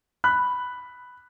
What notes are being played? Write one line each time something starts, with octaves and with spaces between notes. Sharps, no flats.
B5 F#6